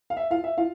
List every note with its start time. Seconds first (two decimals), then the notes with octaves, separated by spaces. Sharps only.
0.10 F5
0.17 E5
0.30 F4 F5
0.44 E5
0.57 F4 F5